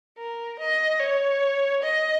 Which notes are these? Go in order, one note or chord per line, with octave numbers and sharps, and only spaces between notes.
A#4
D#5
C#5
D#5